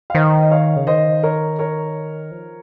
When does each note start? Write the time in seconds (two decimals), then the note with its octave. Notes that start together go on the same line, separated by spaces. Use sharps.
0.10 F5
0.14 D#3 C5 D#5
0.42 D#5
0.51 C#5 F5
0.76 C#3
0.87 D#3 C5 D#5
1.23 A#4 C#5
1.59 A#4 C#5
2.31 F3